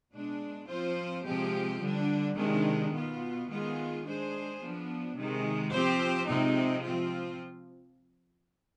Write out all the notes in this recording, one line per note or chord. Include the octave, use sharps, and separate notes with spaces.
B2 G#3 D4
F3 C4 F4 C5
C3 F3 G#3 C4 G4
D3 G3 D4
C3 D#3 G#3 D4
B2 B3 F4
D#3 G#3 B3 F4 G#4
G#3 D4 G#4 C5
F3 B3 D4
C3 D#3 G#3
F3 C4 G4 C5
C3 F3 G#3 C4 D#4
F3 C4 F4